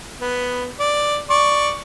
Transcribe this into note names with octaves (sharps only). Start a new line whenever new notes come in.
B3
D5
D5 C#6